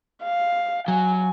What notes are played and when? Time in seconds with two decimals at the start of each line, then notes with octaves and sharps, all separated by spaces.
0.23 F5
0.88 F#3 G#5